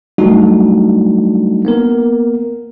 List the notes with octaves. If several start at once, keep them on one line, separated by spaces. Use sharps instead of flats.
F#3 G3 A3 D4 D#4 F#4
A#3 B3 A#4